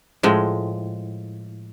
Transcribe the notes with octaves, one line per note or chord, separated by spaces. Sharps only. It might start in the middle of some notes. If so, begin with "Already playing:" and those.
A2 F3 G#3